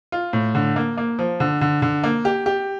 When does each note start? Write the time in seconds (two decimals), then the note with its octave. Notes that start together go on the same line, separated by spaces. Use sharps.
0.12 F4
0.33 A2
0.55 D3
0.76 A#3
0.98 A#3
1.19 F3
1.40 D3
1.61 D3
1.82 D3
2.04 A#3
2.25 G4
2.46 G4